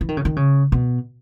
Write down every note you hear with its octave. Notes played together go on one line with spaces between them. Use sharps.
E3
D#3
C#3
D#3
C#3
B2